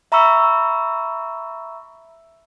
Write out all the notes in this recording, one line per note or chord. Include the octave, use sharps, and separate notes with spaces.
E5 A#5 B5 C#6 E6